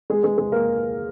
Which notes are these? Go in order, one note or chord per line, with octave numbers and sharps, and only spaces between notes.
G#3 G#4
G#3 G#4
G#3 G#4
A#3 A#4